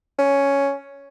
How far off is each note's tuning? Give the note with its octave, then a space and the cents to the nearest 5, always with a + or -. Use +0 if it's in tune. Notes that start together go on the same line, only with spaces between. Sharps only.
C#4 +5